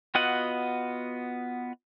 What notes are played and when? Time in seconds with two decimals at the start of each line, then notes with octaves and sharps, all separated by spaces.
0.15 B3 F4 F#4 D#5 F#5